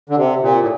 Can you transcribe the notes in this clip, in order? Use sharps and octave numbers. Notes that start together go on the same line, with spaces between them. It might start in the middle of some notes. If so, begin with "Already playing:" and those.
D3
C3
A#2
A2